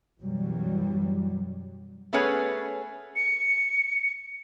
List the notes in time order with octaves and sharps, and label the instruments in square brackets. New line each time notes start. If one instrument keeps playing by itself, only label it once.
[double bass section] F#2 B2 E3 F#3 G3
[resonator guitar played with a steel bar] A3 B3 C#4 G#4 B4 C#5
[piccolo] C#7